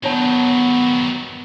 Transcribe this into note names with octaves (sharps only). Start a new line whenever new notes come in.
D#3 F#3 B3 D4 C#5 A5